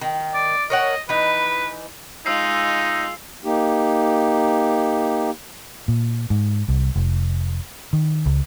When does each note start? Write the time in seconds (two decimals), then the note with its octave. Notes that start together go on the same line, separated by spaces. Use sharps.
0.01 D#3
0.34 D5
0.70 A#4 C#5 D#5 F#5
1.09 E3 D#4 B4
2.26 G#3 D#4 F4 E6 C7
3.44 A#3 D#4 G4
5.88 A#2
6.30 G#2
6.68 C2
6.95 F1
7.93 D#3
8.26 C#2